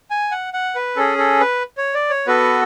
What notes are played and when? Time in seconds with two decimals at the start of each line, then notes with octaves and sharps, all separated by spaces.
0.10 G#5
0.31 F#5
0.54 F#5
0.75 B4
0.96 C#4 G#4 A4
1.18 A4
1.40 B4
1.77 C#5
1.94 D5
2.10 C#5
2.27 B3 F#4 A4 B4